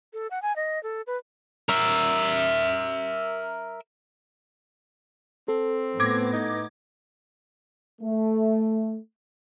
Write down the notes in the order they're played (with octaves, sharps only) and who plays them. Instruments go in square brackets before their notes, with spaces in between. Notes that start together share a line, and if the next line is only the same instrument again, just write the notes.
[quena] A4
F#5
G#5
D#5
A4
B4
[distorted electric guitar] A#4 E5
[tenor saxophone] C4 [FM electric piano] A4
[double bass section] A2 B3 [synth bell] D6 G#6 A#6
[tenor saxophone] D#4
[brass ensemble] A3